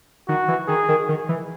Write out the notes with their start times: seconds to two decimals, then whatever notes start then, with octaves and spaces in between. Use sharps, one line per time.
0.28 D#3 F#4
0.48 E3
0.68 D#3 G#4
0.89 D#3
1.09 D#3
1.29 E3